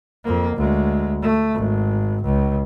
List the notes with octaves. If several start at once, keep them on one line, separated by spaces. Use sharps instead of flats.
F2 A#3
D2 G#3
A3
G#1
C#2